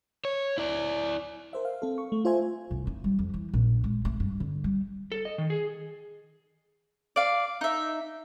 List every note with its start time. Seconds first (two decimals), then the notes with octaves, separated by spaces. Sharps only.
0.25 C#5
0.58 E4 D5
1.53 A#4 C5 E5
1.65 F5
1.82 C4 A4
1.98 C#6
2.12 A3
2.25 F4 C5 E5 G#5
2.71 C2
2.87 D#4
3.04 G3
3.19 F2
3.34 E3
3.54 A#1
3.84 G#3
4.05 A3
4.20 G2
4.40 D3
4.64 G3
5.12 A4
5.25 D#5
5.38 D#3
5.50 G#4
7.16 D5 F5
7.61 D#4 E5